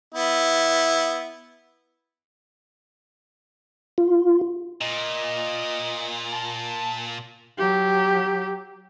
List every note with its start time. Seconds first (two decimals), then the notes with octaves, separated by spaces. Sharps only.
0.14 B3 E4
3.98 F4
4.81 A#2 D#5
6.32 A5
7.58 F#3 G4